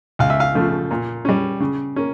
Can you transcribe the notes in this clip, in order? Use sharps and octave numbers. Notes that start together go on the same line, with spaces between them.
C#2 F5
E5
F5
C#3 F3 A3
A#2
G3 C#4
C#3
A#3 C#4